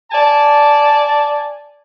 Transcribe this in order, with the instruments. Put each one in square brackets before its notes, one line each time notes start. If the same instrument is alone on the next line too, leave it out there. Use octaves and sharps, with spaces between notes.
[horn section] D5 G#5 A5